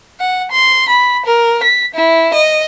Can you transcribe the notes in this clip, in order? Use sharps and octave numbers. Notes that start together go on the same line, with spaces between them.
F#5
C6
B5
A#4
B6
E4
D#5